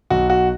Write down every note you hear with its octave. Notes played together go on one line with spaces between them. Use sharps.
B1 F#4
F#4